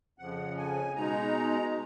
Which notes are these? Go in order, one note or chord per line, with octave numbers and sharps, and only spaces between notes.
F2 C#3 F3 F#5
G#5
B2 G#3 D#4 A#5